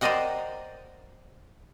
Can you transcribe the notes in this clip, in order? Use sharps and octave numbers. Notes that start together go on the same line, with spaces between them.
A#4 C5 D5 D#5 F#5 G5